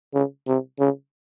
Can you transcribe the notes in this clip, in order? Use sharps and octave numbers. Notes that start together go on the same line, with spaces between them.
C#3
C3
C#3